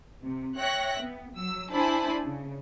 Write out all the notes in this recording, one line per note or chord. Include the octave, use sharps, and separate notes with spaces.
C3
C#5 E5 G5 F#6 A#6
B3
F#3 E6
D4 E4 C5 G#5 A5 B5
C#3